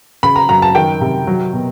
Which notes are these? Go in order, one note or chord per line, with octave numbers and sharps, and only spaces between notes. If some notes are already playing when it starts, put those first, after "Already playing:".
C#3 B5
A#5
F#2 A#5
A5
D#3 G5
C3
F#3
B2